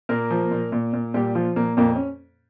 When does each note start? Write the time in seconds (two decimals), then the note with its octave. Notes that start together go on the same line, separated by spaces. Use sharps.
0.09 A#2 A#3 A#4
0.30 F3
0.51 A#2
0.72 A#2
0.93 A#2
1.14 A#2 G3 G4
1.35 F3 F4
1.56 A#2 A#3
1.77 F2 A#2 A#3
1.96 C#4